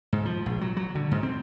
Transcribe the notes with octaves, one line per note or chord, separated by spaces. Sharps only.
G#2
F3
A#1
F#3
F#3
D3
G#2
C4